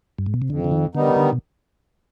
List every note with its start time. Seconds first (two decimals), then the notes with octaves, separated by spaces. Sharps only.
0.19 G2
0.26 G#2
0.34 B2
0.42 C3
0.50 F2 D3
0.64 D3
0.72 D#3
0.95 D3 D#3 G3 B3 D#4
1.16 D3
1.33 B2